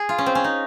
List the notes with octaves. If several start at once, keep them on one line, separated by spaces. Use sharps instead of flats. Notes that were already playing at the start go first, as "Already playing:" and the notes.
Already playing: G#4
F4
C#4
C4
C#4
D#4